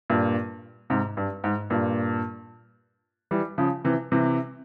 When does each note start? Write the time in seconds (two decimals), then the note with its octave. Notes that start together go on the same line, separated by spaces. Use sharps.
0.10 G2 A#2
0.90 G#2 C3
1.17 G2
1.44 G#2
1.70 G2 A#2
3.31 E3 G3
3.58 C#3 F3
3.85 C3 E3
4.12 C3 E3